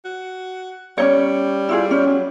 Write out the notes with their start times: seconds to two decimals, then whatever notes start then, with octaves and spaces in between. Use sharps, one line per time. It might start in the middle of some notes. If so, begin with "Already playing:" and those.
0.05 F#4
0.98 G3 C#4 D#4 C#5
1.69 E4 F4 G#4
1.91 C#4
2.07 F#3